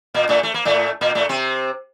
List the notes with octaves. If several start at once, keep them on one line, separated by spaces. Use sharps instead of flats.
A#2 A#3
A2 A3
A3
A#3
A2 A3
A#2 A#3
A2 A3
C3 C4